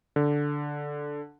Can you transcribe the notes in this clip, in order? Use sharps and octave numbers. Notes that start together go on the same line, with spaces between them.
D3